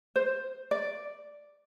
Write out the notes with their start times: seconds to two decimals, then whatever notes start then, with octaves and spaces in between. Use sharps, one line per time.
0.16 C5
0.71 D5